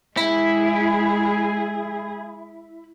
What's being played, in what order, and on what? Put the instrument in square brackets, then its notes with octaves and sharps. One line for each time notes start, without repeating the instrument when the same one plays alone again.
[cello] G#3 G#4 [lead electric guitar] E4